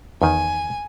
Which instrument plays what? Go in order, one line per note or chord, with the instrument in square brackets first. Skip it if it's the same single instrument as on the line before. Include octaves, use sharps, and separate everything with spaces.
[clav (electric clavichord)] E2 D#3 [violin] G#5